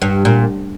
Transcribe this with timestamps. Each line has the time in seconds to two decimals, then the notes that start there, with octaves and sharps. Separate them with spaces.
0.02 G2
0.25 A#2